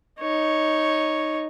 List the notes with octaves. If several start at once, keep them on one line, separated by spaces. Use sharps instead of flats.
D#4 C#5